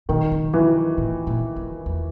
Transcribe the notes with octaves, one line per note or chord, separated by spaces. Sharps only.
B2 D#3
C#3
C3 E3
A2
A#2
E2
E2